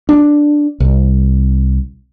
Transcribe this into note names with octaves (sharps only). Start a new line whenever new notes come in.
D4
C2